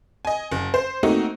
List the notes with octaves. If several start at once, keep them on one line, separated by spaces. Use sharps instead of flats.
D#5 G#5
F#1
C5
A3 A#3 C4 D#4 F#4